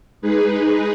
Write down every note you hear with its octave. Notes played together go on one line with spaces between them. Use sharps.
G#3 D#4 G#4 B4